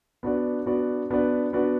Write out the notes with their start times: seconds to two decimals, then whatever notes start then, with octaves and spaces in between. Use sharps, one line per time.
0.23 B3 D4 F#4 B4 D5
0.66 B3 D4 F#4 B4 D5
1.10 B3 D4 F#4 B4 D5
1.53 B3 D4 F#4 B4 D5